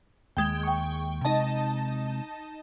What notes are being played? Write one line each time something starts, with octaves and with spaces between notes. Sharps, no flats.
D#2 G#3 G5
G5 C#6
C3 G#3 D#4 D#5 A5